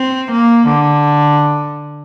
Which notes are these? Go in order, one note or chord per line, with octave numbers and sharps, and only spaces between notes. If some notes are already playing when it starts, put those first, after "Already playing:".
Already playing: C4
A#3
D3